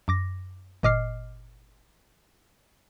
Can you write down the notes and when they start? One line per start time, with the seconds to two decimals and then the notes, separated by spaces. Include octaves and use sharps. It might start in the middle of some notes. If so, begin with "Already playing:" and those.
0.08 F#2 D6 A#6
0.83 G1 A#2 D#5 D6 F6 C7